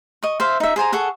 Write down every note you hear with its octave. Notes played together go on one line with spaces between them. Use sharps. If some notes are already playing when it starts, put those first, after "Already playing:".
D#5 C#6
C5 E5 F5
D#4 E5
G#4 C5 G#5 A#5
G#4 A4 F#5 C#6